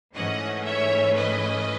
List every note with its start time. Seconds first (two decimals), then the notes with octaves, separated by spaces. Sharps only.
0.14 G#2 E3 A3 C#4 D#5 F#5
0.65 C#5 E5
1.16 B4 D#5